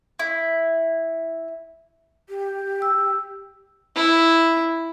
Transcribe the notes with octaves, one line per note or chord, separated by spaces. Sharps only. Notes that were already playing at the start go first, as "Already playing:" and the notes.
E4
G4
E6
E4